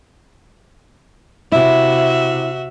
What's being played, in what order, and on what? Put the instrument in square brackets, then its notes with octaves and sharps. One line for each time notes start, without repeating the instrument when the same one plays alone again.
[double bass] C3 [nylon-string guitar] E4 [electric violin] F#4 E5